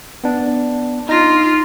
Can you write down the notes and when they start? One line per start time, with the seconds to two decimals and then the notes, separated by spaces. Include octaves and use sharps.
0.24 B3 D4
1.09 D#4 F4 A#6